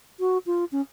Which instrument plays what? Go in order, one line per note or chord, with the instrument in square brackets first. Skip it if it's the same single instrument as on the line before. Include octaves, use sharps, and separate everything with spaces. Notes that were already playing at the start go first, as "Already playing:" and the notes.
[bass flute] F#4
F4
C#4